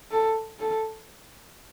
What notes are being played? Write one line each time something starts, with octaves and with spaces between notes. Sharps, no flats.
A4
A4